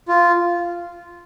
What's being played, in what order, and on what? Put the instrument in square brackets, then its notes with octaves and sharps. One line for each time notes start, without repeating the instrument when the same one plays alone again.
[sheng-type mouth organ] F4